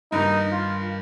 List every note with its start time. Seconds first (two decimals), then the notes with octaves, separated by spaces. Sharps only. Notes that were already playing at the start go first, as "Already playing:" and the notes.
0.12 G2 D#3 A#3 D#4
0.52 F4